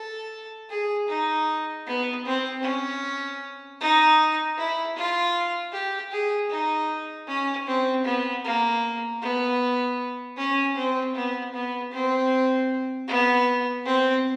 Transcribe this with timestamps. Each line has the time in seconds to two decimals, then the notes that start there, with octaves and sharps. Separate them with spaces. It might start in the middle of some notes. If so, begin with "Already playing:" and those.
Already playing: A4
0.70 G#4
1.08 D#4
1.87 B3
2.25 C4
2.63 C#4
3.80 D#4
4.58 E4
4.96 F4
5.72 G4
6.12 G#4
6.50 D#4
7.28 C#4
7.67 C4
8.05 B3
8.44 A#3
9.22 B3
10.37 C#4
10.76 C4
11.15 B3
11.54 B3
11.93 C4
13.08 B3
13.86 C4